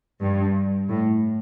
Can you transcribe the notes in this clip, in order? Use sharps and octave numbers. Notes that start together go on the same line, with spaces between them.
G2
A2